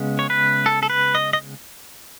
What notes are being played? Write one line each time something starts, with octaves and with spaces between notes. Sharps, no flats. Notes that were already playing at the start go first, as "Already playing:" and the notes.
Already playing: C#3 G#3 B3
C#5
B4
A4
A4
B4
D#5
D#5